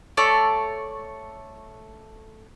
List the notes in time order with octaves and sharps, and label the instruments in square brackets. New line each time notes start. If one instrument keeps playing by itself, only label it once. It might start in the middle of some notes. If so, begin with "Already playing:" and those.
[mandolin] A3 A4 C#5 D5